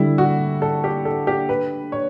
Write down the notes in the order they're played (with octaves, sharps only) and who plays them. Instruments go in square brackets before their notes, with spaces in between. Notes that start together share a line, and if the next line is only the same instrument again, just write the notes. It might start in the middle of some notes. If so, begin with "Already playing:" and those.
Already playing: [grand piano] D3 G3 D4 [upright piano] E4
[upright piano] F#4
A4
G4
A4
G4
B4
C#5